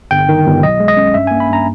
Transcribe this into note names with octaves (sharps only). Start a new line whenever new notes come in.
G1 G5
D#3
G1
B1 D#5
G#3
D#5
C#4
G2 E5
A#3 G#5
B5
G2 A#5